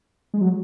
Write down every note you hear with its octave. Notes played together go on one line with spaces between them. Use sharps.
G#3
F#3